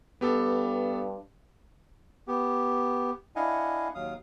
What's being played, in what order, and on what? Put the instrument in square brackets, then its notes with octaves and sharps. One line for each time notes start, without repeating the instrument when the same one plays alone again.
[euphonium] G2 [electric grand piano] B3 G4 A4
[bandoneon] B3 G4
D4 E4 D#5 F5 F#5 G#5
D#2 F#3 F5 D#6